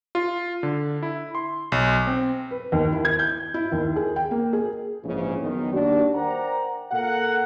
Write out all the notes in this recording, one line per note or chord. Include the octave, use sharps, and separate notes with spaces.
F4
D3
E4
C6
B1
C4
B4
D#2
E4
G#6
G6
E4
D#2
G#4
G5
A#3
G#4
A#1 G#2 C#3 E3
F#2 D#3 B3
D#2 G3 D4 F#4
A#4 C5 D5 F#5 G5 A#5
A#2 A4 A#4 F5 F#5